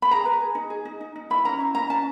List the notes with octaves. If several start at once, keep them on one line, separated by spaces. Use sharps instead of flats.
B5
G#4 A#5
B4
G#4
D#4
G#4
D#4
D#4
D#4
E4 B5
C#4 A#5
E4
C#4 A#5
C#4 A5